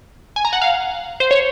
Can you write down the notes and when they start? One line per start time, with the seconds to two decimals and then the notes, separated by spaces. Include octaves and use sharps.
0.36 G#5
0.45 A#5
0.53 F#5
0.62 F5
1.20 C5
1.31 C#5